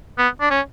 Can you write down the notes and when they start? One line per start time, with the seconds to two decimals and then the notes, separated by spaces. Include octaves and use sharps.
0.18 B3
0.41 D4
0.50 C#4